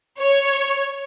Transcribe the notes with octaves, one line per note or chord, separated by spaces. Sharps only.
C#5